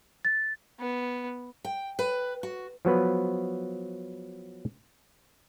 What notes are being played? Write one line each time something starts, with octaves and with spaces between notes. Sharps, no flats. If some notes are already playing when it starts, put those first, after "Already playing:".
A6
B3
G5
B4
F#4
F3 F#3 B3 B4